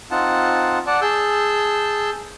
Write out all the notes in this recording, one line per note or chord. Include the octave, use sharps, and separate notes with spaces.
C4 D#4 F4 F#5 A5
D5 F#5 A5
G#4 A5 E6 G6